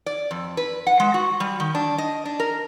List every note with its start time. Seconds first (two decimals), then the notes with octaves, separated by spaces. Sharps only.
0.06 D5
0.31 F2
0.57 B4
0.87 F#5
1.00 G#3
1.14 F#4
1.40 G3
1.60 D#3
1.75 D4
1.98 D#5
2.25 D4
2.40 A#4